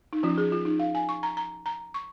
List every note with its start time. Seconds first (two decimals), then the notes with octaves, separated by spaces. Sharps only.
0.13 D#4
0.23 F3 C#4 F4
0.38 G#4
0.52 F4
0.65 D#4
0.79 F5
0.95 G#5
1.09 C#6
1.23 A#5
1.37 A#5
1.66 A#5
1.94 C#6